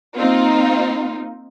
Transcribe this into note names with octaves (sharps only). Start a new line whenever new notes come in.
A#3 C4 D#4 F4